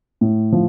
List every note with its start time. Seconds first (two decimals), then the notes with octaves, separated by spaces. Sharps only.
0.21 A2
0.52 F3